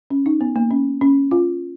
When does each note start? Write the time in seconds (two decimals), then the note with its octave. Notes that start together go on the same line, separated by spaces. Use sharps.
0.10 C#4
0.26 D#4
0.41 B3
0.56 A#3
0.71 C#4
1.01 C#4
1.31 F4